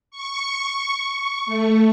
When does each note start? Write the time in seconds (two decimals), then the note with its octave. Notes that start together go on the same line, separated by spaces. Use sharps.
0.11 C#6
1.46 A3